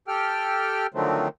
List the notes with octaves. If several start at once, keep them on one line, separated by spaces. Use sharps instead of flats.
G4 A4 G5 F6
D3 D#3 F3 F#3 A3 C4